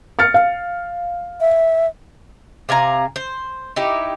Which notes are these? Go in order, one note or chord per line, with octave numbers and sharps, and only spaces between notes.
F6 A6 C#7
F5
E5
C3 F5 G#5 A#5
C5
D#4 E4 G4